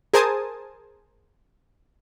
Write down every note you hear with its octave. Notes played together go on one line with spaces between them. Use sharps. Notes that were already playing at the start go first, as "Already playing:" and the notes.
G#4 A#4 C5 G#5 A5 D#6